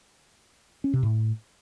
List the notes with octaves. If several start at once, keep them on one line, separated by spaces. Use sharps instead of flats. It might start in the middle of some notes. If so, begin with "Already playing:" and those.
C#4
C3
A2